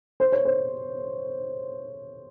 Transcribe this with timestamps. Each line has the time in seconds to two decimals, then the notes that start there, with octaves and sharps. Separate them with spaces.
0.20 C5
0.32 C#5
0.45 C5